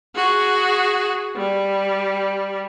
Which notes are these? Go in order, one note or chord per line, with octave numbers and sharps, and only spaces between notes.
F#4 G#4
G3